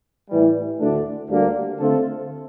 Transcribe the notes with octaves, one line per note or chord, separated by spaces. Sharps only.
A2 E3 G3
D2 D3 A3 D4
D2 D3 G3 A#3
D3 A3 C4 F4 A4